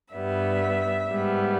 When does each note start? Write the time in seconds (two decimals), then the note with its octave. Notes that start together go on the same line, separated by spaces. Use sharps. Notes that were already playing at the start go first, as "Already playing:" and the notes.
0.13 G2 G3 B3 E5
1.09 G#2 G3 B3